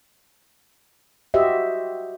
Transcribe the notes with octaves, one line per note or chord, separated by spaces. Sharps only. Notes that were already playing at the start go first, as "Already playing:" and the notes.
F#4 G4 C5 D#5 E5